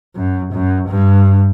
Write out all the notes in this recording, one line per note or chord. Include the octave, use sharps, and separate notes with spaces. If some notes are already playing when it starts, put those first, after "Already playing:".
F#2
F#2
G2